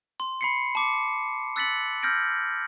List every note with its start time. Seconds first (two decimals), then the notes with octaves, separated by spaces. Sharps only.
0.20 C6
0.41 B5 C7 C#7
0.75 A5 D6 C#7
1.56 E6 F#6 A6 B6 C#7 F#7
2.03 E6 F6 G6 G#6 A#6 D7